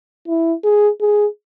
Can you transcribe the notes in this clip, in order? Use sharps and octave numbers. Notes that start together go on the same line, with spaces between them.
E4
G#4
G#4